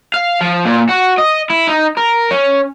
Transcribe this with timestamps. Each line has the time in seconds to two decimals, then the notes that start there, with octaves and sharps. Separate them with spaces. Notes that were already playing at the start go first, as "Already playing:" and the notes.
0.14 F5
0.41 F3
0.65 A#2
0.89 F#4
1.18 D#5
1.50 E4
1.67 D#4
1.97 A#4
2.31 C#4